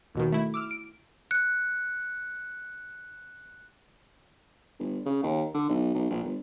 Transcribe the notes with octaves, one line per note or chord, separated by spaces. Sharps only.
D#2 B2 D#3
A3 E4
D6 E6 F6
D7
F#6 C#7
G1
C#3
D#2
D3
B1
B1
A#1
G1